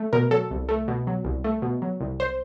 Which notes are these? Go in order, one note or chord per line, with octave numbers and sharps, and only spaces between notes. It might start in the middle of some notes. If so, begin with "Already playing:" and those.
Already playing: A3
B2 A#4
F#3 A4
C2
A3
B2
F#3
C2
A3
B2
F#3
C2
C5